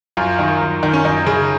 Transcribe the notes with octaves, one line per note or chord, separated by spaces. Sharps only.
F#2 F4
D#3
F#2
D#3
C#4
F#2 D#4
C#3